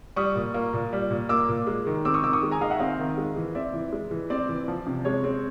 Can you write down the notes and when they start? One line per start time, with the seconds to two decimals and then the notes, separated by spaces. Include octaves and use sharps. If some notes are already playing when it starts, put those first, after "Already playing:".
0.16 G3 C#6 D#6
0.36 A#2
0.54 A#3
0.73 A#2
0.93 G3
1.11 A#2
1.29 A#3 D6 E6
1.48 A#2
1.67 G#3
1.87 D#3
2.05 C4 D6 E6
2.14 C#6 D#6
2.24 D#3 D6 E6
2.33 C#6 D#6
2.43 G#3
2.51 G#5 A#5
2.61 D#3 D#5 F5
2.71 E5 F#5
2.79 C4 D#5 F5
2.99 D#3
3.17 G#3
3.36 E3
3.55 C4 D5 E5
3.74 E3
3.92 G#3
4.11 E3
4.30 C4 D5
4.49 E3
4.68 F3
4.87 C3
5.05 G#3 C#5
5.24 C4